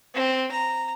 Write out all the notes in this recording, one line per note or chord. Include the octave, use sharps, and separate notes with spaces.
C4
A#5